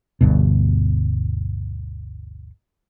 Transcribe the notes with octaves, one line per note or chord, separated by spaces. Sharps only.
G1 D2 G2 B2